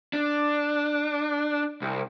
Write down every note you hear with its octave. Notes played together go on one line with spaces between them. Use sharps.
D4
C2